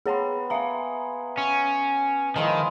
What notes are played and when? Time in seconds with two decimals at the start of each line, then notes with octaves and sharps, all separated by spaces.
0.06 B3 G#4 C#5 G5 A#5 C6
0.50 G#4 B4 E5 F5 A#5
1.37 C#4
2.36 D#3 F3 G#3 E4 A5